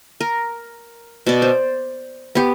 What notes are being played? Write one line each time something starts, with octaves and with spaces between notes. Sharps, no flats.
A#4
B2 D5
C5
B3 G4